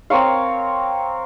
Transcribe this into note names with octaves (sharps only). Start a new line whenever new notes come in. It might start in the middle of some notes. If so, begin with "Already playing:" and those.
C4 A#4 C#5 F5